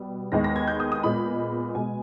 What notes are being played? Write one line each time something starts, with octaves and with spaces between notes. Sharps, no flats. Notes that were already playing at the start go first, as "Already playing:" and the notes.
Already playing: B2 G3 B3
D#2 D#3 G#3 B3 A#6
A#6
G#6
G6
D#6
D#6
A#2 G#3 B3 B5
B2 G#3 B3 G#5